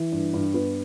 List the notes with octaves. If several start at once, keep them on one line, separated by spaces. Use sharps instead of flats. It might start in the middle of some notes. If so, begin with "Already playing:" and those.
Already playing: E3
G2
G2
B3